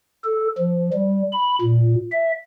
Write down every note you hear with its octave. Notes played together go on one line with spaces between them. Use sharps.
A4
F3
G3
B5
A#2
E5